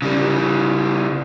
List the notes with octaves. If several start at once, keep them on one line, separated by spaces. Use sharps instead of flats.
C#3 G3